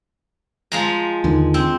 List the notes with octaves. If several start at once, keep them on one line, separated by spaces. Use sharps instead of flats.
F3 G#3 A#5
D#2 D3 D#3
C4